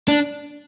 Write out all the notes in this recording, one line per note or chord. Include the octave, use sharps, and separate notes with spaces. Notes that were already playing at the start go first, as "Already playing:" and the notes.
D4